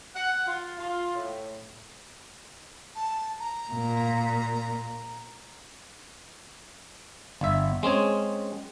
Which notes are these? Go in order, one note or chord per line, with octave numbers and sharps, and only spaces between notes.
F#5
F4
F4
A2
A5
A#5
A#2
G1 E5
G#3 C4 C#4 G#4